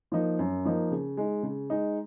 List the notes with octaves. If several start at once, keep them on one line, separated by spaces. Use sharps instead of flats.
F3 A#3 D#4
F#2
F3 A#3 D#4
C#3
G#3 D#4
C#3
G#3 D#4